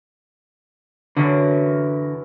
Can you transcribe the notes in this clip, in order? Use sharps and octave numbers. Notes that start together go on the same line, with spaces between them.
F#2 D3 E3 A#4